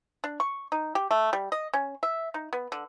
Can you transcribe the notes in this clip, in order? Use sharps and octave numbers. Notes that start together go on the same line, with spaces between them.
D4
C#6
D#4
G4
A3
G3
D#5
C#4
E5
D#4
B3
D3